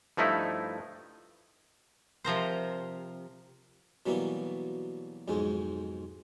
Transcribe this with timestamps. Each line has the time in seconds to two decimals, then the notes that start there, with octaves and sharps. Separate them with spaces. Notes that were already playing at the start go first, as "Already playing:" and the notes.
0.17 G2 F3 A3 D#4 E4
2.24 C3 F3 A#4 C5
4.06 B2 E3 F#3 G3 A#3 B3
5.28 B1 F2 G#2 G#3